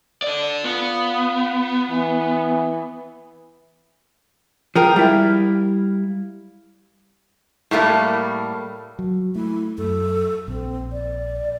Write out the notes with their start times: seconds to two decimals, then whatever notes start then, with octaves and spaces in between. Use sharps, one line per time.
0.22 A4 D5
0.64 B3 F4
1.91 E3
4.76 F3 G#4 A#4 G5
4.96 G3 E4 F5
7.71 A2 G3 A3 A#3
8.99 F#3
9.35 A3 E4
9.78 F#2 A4
10.48 A#1 C4
10.92 D5